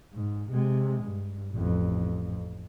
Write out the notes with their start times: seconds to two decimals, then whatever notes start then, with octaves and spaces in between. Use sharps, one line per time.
0.13 G#2
0.51 C3 G#3
1.03 G2
1.53 A1 F2